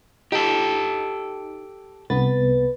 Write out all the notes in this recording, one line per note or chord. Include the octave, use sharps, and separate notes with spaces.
D#4 G4 A4
C2 B3 B4 A6